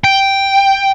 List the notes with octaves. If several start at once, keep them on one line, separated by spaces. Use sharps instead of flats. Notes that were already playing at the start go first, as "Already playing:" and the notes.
G5